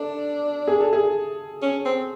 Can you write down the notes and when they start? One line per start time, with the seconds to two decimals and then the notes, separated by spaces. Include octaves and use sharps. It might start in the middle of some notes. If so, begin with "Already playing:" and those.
Already playing: D4 A4
0.68 G#4
0.80 A4
0.93 G#4
1.62 C#4
1.85 C4